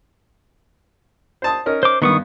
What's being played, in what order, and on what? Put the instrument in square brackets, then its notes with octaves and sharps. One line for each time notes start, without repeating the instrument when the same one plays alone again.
[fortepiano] C5 A5 D#6
C#4 D#4 A#4
[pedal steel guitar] C5 D6
[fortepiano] G2 B3 [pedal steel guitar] D#3 C#6 D#6